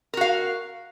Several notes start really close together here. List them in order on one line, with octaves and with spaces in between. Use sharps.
A#4 F#4 F5